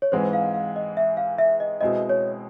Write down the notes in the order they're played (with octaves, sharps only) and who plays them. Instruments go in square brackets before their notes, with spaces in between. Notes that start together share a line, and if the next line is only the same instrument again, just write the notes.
[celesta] C#5
[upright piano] G#2 E3 G#3 C4 [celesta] C5
[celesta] F5
F5
D#5
E5
F5
E5
D#5
[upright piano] B2 G#3 C4 E4 [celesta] D#5
[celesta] C#5